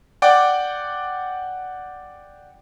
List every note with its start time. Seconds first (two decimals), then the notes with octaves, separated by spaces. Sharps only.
0.22 D5 F#5 G5 D6